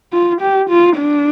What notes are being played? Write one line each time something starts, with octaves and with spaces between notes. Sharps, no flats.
F4
G4
F4
D4